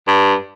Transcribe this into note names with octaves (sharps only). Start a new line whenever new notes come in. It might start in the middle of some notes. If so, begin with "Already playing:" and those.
G2